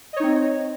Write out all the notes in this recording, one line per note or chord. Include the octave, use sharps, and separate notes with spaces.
C4 D#4 C#5 D#5